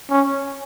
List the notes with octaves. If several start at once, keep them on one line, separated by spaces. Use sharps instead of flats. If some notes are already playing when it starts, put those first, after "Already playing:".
C#4